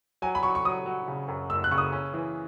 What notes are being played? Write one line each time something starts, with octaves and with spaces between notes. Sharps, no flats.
F#3 G#5
B5
F#3 C#6
C#6
F#3 D#6
F#3
C#3
F#2
F#1 E6
F#6
C#3 C#6
D#6
C#4
E3